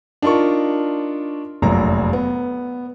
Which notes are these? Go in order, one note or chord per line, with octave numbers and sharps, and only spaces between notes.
D4 D#4 F4 A#4 C#6
F1 A#1 F#2 A#5
B3